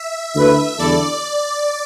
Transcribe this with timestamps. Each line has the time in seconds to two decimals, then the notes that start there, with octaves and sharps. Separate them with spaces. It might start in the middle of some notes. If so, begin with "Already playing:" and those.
Already playing: E5
0.34 D2 D3 A3 E4 B4 E5
0.78 E2 D3 G3 E4 A4 D5